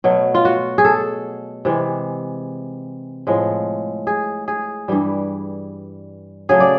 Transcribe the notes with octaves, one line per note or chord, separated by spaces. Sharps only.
B2 F#3 A3
F4
F#4
G#4
A4
C3 E3 G#3
A2 F3 G#3
G#4
G#4
G2 E3 G3
C#3 F#3 A3 G#4
D5